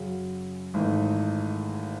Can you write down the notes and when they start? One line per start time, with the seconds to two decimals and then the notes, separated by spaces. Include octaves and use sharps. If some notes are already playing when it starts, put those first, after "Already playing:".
Already playing: F#2 C#3 F#3
0.74 G#1 G#2 E3 A3 D#4